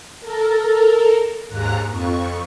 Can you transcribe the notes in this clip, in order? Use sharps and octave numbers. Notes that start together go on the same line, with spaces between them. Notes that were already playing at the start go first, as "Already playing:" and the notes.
A4 A#4
D#2 G#2 A#5 F#6
F2 C#6